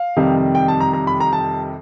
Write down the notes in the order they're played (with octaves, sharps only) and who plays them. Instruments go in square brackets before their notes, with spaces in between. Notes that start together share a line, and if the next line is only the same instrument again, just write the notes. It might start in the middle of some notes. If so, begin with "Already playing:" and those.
Already playing: [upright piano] F5
F2 C3 D#3 G3
G5
A5
A#5
A#5
B5
A#5
A5